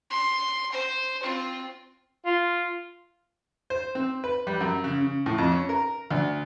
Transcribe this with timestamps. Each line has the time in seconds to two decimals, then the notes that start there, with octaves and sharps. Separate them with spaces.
0.10 C6
0.72 C5
1.21 C4 F4
2.26 F4
3.70 C5
3.95 C4
4.24 B4
4.47 G3
4.60 F#2
4.84 C#3
5.01 C#3
5.26 A2
5.38 F2
5.52 C#4
5.69 A#4
6.11 D2